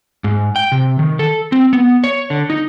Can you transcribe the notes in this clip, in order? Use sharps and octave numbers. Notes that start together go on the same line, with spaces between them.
G#2
G5
C3
D#3
A4
C4
B3
C#5
D3
D#4